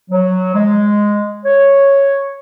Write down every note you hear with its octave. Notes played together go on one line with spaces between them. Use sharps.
F#3
G#3
C#5